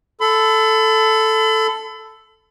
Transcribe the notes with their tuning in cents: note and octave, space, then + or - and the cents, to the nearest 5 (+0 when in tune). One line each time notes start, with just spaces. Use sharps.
A4 +0 B5 +40